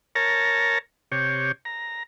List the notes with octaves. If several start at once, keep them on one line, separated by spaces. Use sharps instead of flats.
A#4 C#5 A5 A#5
C3 G4 C#5
A#5